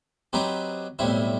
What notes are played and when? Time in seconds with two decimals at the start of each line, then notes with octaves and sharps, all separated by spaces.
0.33 F#3 C4 D#4 G4 B4
0.99 B1 A2 G3 C4 E4